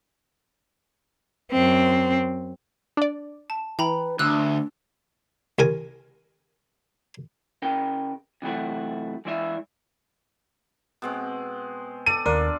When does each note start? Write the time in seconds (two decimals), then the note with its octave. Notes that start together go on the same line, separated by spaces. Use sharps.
1.51 F#2 C4
2.97 D4 D5
3.50 A5
3.79 E3 B4 G5 A#5 B5
4.19 D2 D4 E6 F#6
5.59 C2 A#4 G#5
7.62 C#3 A#4 G5
8.42 C3 E3 F#3 A3 F#4
9.25 E3 G#3 E4 D5 E5
11.02 B2 G#3 C4
12.06 A4 D5 D#7
12.26 D#2 D4 F4 A#4 D5